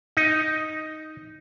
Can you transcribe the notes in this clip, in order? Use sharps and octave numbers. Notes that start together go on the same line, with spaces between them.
D#4